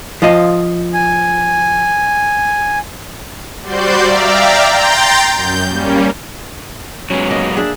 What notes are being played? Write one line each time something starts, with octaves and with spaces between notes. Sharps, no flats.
F3 F4 D#5
G#5
G3 F#4 C5 D5 C6 G6
D5 E5 F5 G5 A#5
G5 A#5 C6 G6 A6
F#2 G6
G3 A#3 C#4
F#3 G#3 B3 C#4
A#3 D#5
D4 G#4 E5